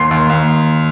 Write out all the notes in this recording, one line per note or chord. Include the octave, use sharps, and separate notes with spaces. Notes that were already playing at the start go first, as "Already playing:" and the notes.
Already playing: D#2 C6 C7
D#2
D#2